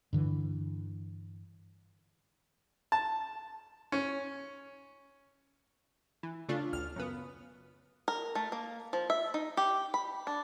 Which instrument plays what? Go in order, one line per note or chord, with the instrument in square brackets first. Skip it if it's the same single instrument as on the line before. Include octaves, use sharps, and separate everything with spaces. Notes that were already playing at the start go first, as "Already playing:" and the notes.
[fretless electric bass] G2 D3 E3
[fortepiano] A5
C#4
[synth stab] E3
C#3 A3 D4 F4
A1 D2 F6
F#2 C#3 B3
[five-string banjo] A#4
A3
A#3
F3
E5
D#4
G4
B5
D4